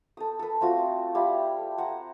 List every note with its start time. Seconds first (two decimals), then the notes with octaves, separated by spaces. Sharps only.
0.17 A4 C5 D#6
0.39 A4 B4
0.61 A3 C4 F4 F#4
1.15 G3 E4 G4 F5
1.58 A4
1.78 C5 F#5 A#5